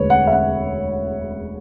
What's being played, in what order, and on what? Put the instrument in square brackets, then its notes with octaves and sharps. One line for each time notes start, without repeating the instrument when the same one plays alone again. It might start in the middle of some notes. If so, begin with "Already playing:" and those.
Already playing: [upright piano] E1 D2 D3 B4 C#5
F#5
E5
F#5